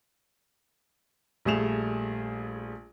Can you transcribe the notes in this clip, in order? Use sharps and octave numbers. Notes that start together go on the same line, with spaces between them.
A#1 G3 A3 G#4 E7 F7